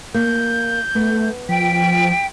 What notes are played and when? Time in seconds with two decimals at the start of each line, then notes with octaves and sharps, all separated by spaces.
0.14 A#3 G6
0.95 A3 B3
1.49 F3 G5 B6